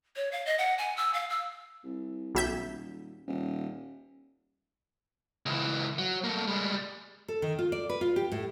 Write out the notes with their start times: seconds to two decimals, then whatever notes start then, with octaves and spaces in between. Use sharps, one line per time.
0.16 C#5
0.32 F5
0.46 D#5
0.58 F#5
0.78 G#5
0.97 E6
1.14 F5
1.30 E6
1.84 C2
2.35 D#1 B1 E5 G6
3.27 D#1
5.46 C#2 E3
5.98 F#3
6.24 A3 A#3
6.47 G3 G#3
7.28 A4
7.42 D#3
7.59 F4
7.72 D5
7.89 B4
8.01 F4
8.16 G4
8.32 A2